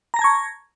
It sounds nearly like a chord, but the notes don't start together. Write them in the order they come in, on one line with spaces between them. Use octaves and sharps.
A#5 A#6 A5 G#6 C#6